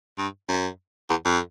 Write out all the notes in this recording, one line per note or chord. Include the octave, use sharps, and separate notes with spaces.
G2
F#2
E2
F2